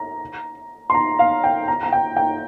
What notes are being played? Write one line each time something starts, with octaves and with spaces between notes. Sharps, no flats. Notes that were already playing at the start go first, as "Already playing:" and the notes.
Already playing: A#5
C6
A#5
F5
G5
A#5
A#5
G5
G5